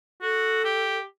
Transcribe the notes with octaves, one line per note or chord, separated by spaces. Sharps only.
F#4 A4
G4